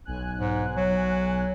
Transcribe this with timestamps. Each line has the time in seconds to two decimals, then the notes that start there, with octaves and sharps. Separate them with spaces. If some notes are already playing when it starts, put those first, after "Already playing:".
0.05 B1 G#5 F#6
0.38 G#2
0.76 F#3